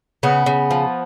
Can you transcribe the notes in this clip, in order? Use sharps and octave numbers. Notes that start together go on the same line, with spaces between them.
C#3 B3
C#3
F3